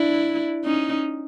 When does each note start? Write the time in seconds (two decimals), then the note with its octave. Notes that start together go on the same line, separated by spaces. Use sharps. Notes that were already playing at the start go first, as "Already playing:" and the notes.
Already playing: D4 E4
0.64 C#4 D#4